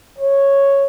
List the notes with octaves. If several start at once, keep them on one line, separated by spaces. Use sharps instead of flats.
C#5